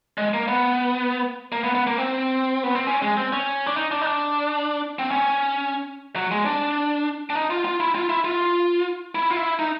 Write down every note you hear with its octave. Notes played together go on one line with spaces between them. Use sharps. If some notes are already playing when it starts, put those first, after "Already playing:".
G#3
A#3
B3
A#3
B3
B3
A#3
C4
B3
C4
C#4
G#3
C4
C#4
D4
D#4
D4
D#4
D4
C4
C#4
F#3
G#3
D4
D4
D#4
F4
F4
E4
F4
E4
F4
E4
F4
E4
D#4